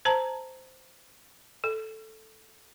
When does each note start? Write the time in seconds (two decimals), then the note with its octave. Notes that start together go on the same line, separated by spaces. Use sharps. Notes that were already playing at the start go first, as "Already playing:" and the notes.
0.05 C5 A5 A#5
1.64 A4